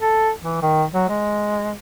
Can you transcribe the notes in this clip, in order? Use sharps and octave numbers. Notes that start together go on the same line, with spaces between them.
A4
E3
D#3
F#3
G#3